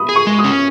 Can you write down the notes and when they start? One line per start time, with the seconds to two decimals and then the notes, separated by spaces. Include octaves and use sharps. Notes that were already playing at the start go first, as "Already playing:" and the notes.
Already playing: B5 D#6
0.09 G#4
0.16 C#6
0.27 G#3
0.39 D#6
0.44 C#4